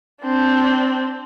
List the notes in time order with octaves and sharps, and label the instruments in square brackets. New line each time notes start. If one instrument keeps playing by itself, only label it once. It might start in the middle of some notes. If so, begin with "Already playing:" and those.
[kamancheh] C4 D4